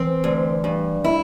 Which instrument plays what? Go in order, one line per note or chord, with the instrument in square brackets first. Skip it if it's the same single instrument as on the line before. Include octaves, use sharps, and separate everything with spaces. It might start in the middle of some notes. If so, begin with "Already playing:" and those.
Already playing: [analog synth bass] E3 [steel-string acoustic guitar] C4
[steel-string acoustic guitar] D2
G2
E4